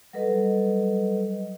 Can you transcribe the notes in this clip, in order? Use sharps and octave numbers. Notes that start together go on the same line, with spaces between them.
F#3 G3 A4 B4 D#5